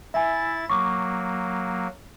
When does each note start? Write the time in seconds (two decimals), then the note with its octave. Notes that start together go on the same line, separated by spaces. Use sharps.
0.14 E4 E5 G#5 A6
0.70 F#3 A#3 C#6 D6